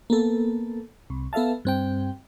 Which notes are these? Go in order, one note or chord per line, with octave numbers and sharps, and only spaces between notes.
A#3 B3 A4
C2
B3 A4 E5 F5 A5
G2 C4 G5